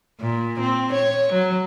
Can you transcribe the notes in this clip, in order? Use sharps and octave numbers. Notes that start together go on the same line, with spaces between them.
A#2
C4
C#5
F#3